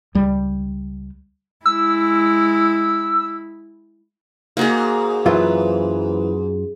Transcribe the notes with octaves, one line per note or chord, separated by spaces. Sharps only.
C#2 G3
G#3 E4 E6
G#2 A#3 F#4 G#4
F#2 E3 F#3 F4 B4